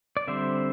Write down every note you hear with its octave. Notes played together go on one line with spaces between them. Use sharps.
D5
D3 G3 C4 C5 E5